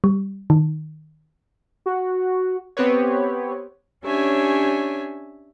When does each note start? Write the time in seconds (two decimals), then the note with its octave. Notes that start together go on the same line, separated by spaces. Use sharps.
0.04 G3
0.50 D#3
1.86 F#4
2.77 B3 C4 G4 B4 C#5
4.04 C#4 D4 G4 C#5 E5 G#5